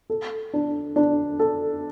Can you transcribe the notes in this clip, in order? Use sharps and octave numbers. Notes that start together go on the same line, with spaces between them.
A4
D4
D4
A4